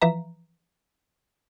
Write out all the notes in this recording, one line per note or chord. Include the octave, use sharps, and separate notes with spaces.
E3 F3 B4 E5 A#5